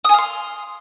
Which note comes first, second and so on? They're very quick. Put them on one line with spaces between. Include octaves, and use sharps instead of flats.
D#6 G#5 F5 C6